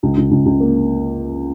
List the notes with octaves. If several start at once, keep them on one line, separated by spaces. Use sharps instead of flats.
C#2
C#2
C#2
C#2
A#3